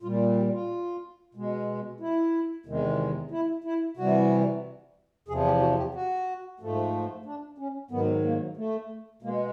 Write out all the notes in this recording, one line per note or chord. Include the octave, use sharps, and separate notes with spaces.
A#2 G3 F4
G4
F4
B2 G#3
E4
E2 C3 D#3 G#3
E4
E4
C3 E3 G3 F#4
E2 C3 F3 G#4
G4
F#4
G4
F#4
G#2 F3 A3
D4
C#4
G#2 D#3 F#3 B3
A#3
A3
B2 G#3 A#3